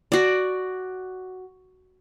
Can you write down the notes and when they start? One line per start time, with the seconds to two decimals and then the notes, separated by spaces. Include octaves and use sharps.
0.12 F#4 D5